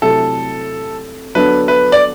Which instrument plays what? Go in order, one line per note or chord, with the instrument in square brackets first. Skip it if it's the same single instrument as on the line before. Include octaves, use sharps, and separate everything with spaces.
[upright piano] C3 F#3 A3 E4 [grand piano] A4
[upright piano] D3 F#3 B3 D4 A4 [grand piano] B4
[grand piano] B4
D5